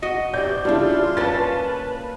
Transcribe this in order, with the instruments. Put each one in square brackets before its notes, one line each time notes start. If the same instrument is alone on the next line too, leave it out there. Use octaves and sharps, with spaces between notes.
[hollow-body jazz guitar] F#4 [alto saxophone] D#5
[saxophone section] G2 C3 E3 [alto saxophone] D5 [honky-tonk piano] G6
[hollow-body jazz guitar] G2 C#3 [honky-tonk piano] G3 D4 E4 [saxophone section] F4
[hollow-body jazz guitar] A#3 C#4 [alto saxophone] B4 [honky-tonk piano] A5 A6